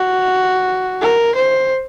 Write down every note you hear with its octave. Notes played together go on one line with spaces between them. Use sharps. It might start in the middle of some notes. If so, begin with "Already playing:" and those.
Already playing: F#4
A#4
C5